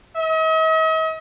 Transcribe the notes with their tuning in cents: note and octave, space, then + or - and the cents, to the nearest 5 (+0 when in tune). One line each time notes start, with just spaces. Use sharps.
D#5 +45